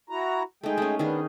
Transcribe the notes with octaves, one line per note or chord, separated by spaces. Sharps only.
E4 F#4 A#5
G#3 A3 D#4 G#4 G5
A3 C#4
D#3 B3 D4 D#4 G#4